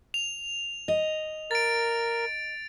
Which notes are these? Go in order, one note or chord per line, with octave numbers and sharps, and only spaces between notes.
F7
D#5
A#4 A6 D7